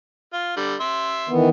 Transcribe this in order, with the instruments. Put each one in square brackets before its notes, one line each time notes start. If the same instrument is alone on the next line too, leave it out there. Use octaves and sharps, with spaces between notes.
[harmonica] F4
D3 G3
E5 C6
[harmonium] D#3 E3 B3